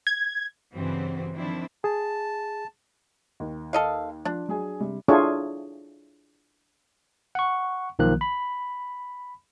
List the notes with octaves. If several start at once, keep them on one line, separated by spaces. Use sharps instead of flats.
G#6
G2 C#3 E3 C4 F#4
D#3 F3 C4 D4 E4
G#4 A5
D#2
A4 D#5 F5
F3 D4
F#3 G#4 G#5
C3 G3
D4 E4 F4 G#4 A4 C#5
F#5 C#6
B1 D#3 F3 A#3 F#6
B5